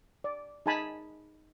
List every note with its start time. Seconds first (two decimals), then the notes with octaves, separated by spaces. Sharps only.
0.24 D5
0.66 D#4 G#4 G#5 A5 B5